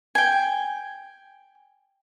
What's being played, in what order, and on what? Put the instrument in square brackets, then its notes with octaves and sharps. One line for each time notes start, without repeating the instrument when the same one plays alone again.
[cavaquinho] G5 G#5